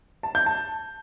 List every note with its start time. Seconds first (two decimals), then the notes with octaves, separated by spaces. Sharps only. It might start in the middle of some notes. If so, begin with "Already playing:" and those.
0.23 A5
0.35 G6
0.46 A5